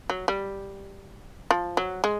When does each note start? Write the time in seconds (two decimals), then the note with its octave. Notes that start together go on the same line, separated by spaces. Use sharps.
0.10 F#3
0.28 G3
1.51 F3
1.77 F#3
2.04 G#3